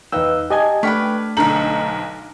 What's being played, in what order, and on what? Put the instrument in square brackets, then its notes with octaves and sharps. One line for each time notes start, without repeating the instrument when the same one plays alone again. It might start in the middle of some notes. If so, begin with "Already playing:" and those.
[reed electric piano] E2 E6 [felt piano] D#4 B4 F5 [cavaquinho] G5
[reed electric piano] G4 D#5 G#5 [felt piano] A5 G#6
[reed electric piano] A3 [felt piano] D4 F6 B6 [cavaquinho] B4 G5 C#6
[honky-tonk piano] B1 D3 F#7 [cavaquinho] D#4 A4 C5